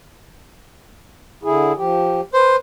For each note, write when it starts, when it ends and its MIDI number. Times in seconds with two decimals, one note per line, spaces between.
1.43 1.73 50
1.43 1.73 64
1.43 1.73 68
1.77 2.21 53
1.77 2.21 67
2.34 2.57 71
2.34 2.56 72